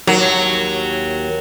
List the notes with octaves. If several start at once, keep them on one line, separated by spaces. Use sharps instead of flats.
D#2 F#3